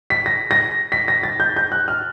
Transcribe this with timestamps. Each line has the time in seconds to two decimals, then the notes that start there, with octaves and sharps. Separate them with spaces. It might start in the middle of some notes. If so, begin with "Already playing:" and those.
0.10 B6
0.26 A#6
0.51 A#6
0.92 B6
1.08 A#6
1.23 A6
1.40 G6
1.56 G6
1.72 F#6
1.88 F6